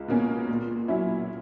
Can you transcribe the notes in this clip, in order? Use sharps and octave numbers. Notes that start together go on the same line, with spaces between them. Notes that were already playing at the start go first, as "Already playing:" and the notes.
Already playing: C#2
B2 A#3 C#4
A#2
F#3 C#4 E4